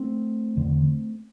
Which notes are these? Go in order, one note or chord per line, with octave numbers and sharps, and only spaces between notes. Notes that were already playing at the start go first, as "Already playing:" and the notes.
Already playing: A3 C4
E2 D3